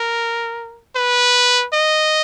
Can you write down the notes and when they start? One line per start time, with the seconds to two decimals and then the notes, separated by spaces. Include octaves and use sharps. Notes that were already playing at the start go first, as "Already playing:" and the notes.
Already playing: A#4
0.96 B4
1.73 D#5